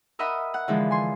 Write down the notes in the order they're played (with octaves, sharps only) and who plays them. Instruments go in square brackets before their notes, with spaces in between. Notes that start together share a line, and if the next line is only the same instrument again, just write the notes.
[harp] A#4 D#5 E5 F#5 B5 D#6
F#5
D3 E3 F3 G#3 E4
G#5 C6